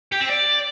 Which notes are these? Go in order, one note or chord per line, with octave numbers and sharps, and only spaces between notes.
G4
C4
D5